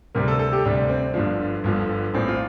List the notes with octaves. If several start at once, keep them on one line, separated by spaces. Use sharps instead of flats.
D2 C3 G3 A#4
A4
A4
G4
D2 C3 G3 D4
D4
C4
G1 G2 D3 F3 D4
G1 G2 D3 F3
A#1 A2 F3 C4
F4